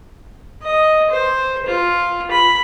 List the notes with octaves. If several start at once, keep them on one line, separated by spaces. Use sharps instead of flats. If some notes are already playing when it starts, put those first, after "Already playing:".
D#5
C5
F4
B5